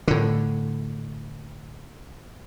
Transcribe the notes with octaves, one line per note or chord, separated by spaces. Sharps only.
A2 D3